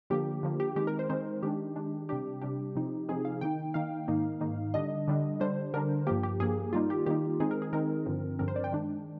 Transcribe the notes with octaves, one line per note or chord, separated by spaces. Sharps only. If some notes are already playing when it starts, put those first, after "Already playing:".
D3 F3 A#3 G4
D3 F3 A#3
G4
D#3 G#3 C4 D#4 G4
A#4
C5
D#3 G#3 C4 D#4 C5
D#3 G#3 D4 G4
D#3 G#3 D4
C3 G3 D4 G4
C3 G3 D4 G4
C3 F3 C4 D#4
C3 F3 C4 D#4 G#4
F5
D#3 A#3 D#4 G5
D#3 A#3 D#4 F5
G#2 D#3 A#3 D#4
G#2 D#3 A#3 D#4
D3 G3 D4 D#5
D3 G3 D4
D3 G3 D4 C5
D3 G3 D4 A#4
G2 F3 A#3 G4
G4
G2 F3 A#3 G#4
D#3 G3 A#3 D#4 F4
G4
D#3 G3 A#3 D#4 G4
D#3 G#3 C4 D#4 G#4
A#4
G#4
D#3 G#3 C4 D#4 A#4
G2 D3 F3 C4
G2 D3 F3 C4 A#4
C5
D5
G5
D#3 G#3 D4